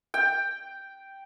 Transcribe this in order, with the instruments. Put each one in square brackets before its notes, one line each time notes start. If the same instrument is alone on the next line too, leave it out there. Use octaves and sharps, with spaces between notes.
[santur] G5